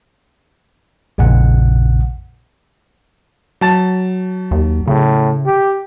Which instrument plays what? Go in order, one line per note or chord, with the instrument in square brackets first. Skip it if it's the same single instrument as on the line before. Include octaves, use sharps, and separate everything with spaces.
[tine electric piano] A#1 F2 A#2 C#3 F#5
[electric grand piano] F#3 A5 A6
[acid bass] D#2
[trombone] A2 [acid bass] C#3
[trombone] G4